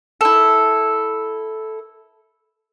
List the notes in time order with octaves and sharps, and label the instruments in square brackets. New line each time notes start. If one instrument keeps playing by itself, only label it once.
[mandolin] E4 A4